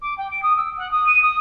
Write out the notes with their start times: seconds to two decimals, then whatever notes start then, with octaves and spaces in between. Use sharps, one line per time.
0.01 D6
0.17 G5
0.30 D7
0.42 D#6
0.56 E6
0.77 F#5
0.91 D#6
1.06 D#7
1.22 D#6